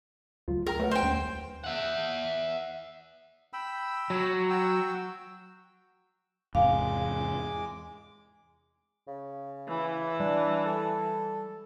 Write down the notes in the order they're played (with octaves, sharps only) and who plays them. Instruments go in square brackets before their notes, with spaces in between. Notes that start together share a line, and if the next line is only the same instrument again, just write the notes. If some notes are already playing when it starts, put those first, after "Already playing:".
[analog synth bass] D2 [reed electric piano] F#3 F4
[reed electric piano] G#4 G5 A#5 [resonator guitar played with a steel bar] A#4
[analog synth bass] A3 [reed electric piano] B4 C#5 F#5
[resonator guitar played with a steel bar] C5 G5
[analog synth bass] D#2 [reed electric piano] G3 C#4
[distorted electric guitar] E5 F#5
[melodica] G5 B5 E6
[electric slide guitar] F#3
[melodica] F#4 G5 E6
[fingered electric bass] E2 G#2 C3 [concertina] G#3 D6 [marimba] F5
[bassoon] C#3
[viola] E3
[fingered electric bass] G3 [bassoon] D4
[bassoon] A4